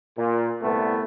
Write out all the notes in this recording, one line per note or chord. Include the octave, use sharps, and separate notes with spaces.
A#2
C2 A3 B3